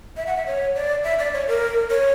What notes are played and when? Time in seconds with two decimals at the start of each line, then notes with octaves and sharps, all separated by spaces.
0.17 E5
0.27 F#5
0.37 E5
0.46 C#5
0.75 D5
1.04 E5
1.19 D5
1.34 C#5
1.48 A#4
1.91 C#5